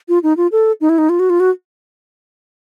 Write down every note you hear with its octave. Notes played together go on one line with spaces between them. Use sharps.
F4
D#4
F4
A4
D#4
E4
D#4
F4
F#4
F4
F#4